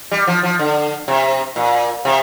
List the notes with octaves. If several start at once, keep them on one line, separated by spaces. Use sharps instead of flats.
G3
F3
F3
D3
C3
A#2
C3